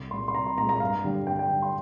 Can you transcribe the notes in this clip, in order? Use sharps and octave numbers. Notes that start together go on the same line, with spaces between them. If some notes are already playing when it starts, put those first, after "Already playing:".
Already playing: C2
A#2 G#3 C6
C6
C2 A#5
C6
A#2 G#3 A#5
A#5
G2 F5
D3 G3
G2 G5
G5
D3 G3
C6